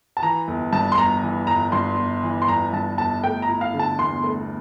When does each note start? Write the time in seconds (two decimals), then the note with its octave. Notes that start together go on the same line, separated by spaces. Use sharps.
0.17 A5
0.22 E3 A#5
0.48 G1
0.72 G2 A5
0.92 C6
0.97 G1 A#5
1.22 E3
1.47 G1 A#5
1.72 G2 C6
1.98 G1
2.23 E3
2.42 C6
2.48 G1 A#5
2.73 G2 A5
2.98 G1 A5
3.24 A3 G5
3.42 A#5
3.48 E4
3.61 F5
3.74 D3
3.79 A5
3.98 E2 C6
4.24 A3